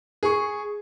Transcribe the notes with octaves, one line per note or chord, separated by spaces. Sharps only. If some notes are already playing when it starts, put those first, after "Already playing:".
G#4 C#6